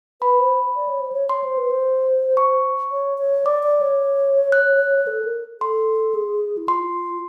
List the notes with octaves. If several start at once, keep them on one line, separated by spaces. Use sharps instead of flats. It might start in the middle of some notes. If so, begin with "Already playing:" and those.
B4 B5
C5
D5
C#5
C5
C#5
C#5 C6
C5
B4
C5
C#6
C#5
C#5
D5 D6
D5
C#5
F#6
A4
A#4
A4 C6
G#4
E4
F4 C6